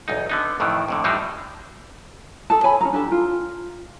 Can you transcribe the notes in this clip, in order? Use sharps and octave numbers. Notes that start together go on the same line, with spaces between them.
B1 E2 D#4
D3 B3 D#4
F2 A2 D#3 E3
F2 A2 D3
A2 E3 F3 G3 D4 D#4
G#4 A4 A5
C#5 G#5 B5
C#4 G#4 A#5
D4 G4 A4 A5
F4